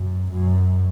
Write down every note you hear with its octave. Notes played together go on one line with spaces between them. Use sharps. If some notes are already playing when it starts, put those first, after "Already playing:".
Already playing: F#2
F#2